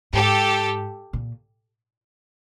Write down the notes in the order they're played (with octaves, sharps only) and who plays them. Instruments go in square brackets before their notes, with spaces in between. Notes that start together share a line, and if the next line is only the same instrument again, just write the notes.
[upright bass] G#2 [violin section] G4 A4
[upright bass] A#2